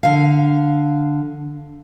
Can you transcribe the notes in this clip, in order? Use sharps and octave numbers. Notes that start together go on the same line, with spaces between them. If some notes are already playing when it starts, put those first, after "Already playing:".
D3 F5